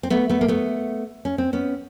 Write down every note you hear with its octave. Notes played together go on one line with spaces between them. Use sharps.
C4
A3 B3
A3 B3
A#3
A3 B3
C#4
C4
B3 C#4